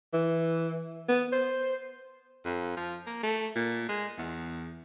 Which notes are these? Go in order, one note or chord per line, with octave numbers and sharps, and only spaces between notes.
E3
B3
C5
F2
F3
A#3
A3
A#2
G#3
E2